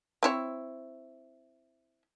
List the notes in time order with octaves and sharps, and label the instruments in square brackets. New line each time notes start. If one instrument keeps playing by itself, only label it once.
[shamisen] C4 E4 C#5